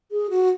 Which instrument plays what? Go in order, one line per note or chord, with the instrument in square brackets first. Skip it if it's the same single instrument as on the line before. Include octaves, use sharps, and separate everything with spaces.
[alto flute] G#4
F#4